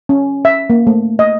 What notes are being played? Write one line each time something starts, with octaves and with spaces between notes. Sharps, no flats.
C#4
E5
A#3
A3
D#5